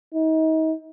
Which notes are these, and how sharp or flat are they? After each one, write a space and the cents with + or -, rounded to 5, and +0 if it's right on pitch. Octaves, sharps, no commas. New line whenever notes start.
D#4 +35